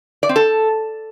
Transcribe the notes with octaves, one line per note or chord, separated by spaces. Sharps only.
D5
C4
A4